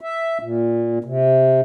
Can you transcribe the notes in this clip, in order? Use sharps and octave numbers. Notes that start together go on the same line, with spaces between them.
E5
A#2
C3